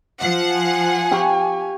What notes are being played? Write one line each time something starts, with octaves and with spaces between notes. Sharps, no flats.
F3 F#5
G#5
G4 F5 C#6